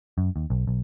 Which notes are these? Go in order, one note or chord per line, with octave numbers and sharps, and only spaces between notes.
F#2
D#2
B1
B1